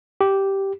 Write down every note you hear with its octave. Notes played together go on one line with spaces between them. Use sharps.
G4